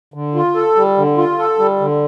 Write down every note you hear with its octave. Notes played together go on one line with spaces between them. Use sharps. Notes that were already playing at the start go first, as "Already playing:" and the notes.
D3
F4
A4
G3
D3
F4
A4
G3
D3